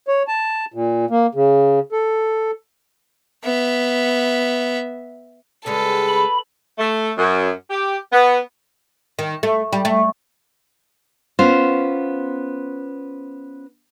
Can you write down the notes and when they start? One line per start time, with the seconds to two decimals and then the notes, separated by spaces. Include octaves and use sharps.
0.08 C#5
0.28 A5
0.74 A#2
1.10 A#3
1.35 C#3
1.92 A4
3.44 B3 E5
5.66 C#3 G3 G#3 A4 B4
6.09 B5
6.78 A3
7.17 F#2
7.70 G4
8.11 B3
9.19 D#3
9.43 A3
9.73 G3
9.85 A3
11.39 B3 C#4 F4 C5